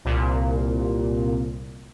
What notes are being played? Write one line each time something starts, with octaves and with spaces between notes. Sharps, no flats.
C2 A#2